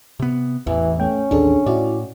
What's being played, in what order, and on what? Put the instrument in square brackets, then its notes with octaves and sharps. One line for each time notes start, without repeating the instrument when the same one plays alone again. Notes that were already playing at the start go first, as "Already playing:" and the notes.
[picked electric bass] C3 B3
[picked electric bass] A1 E2 [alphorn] E3
[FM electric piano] A3 G5 [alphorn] C#4
[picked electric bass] A1 D#2 [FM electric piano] D4 G#4 A4
[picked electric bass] A2 [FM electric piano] E4 F#4 D5